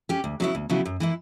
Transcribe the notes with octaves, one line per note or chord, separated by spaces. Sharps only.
C#4 G4
D2
C#3 F#3 B3 E4
D2
C#3 F#3 B3 E4
F#2
E3 A#3 E4